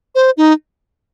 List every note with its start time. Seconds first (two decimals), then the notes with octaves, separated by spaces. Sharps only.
0.15 C5
0.37 D#4